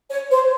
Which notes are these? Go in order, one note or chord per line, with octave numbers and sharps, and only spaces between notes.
C#5
C5